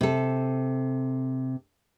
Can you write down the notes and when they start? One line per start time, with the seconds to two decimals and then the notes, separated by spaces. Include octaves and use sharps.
0.01 C3 A4